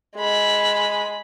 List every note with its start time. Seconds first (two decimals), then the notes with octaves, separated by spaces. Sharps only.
0.17 G#3 B5